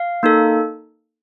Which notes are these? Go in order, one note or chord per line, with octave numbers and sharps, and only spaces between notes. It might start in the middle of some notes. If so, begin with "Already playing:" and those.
Already playing: F5
A#3 D#4 A4